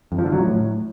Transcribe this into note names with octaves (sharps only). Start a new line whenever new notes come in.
F2
F3
D3
F#3
A2